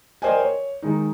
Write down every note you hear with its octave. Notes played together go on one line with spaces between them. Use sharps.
A#4 C5 D5 D#5 G5 G#5
C#5
D#3 G#3 D#4